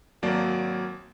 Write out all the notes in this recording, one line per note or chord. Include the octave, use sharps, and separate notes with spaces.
G#1 F#3 A#3 D5 A5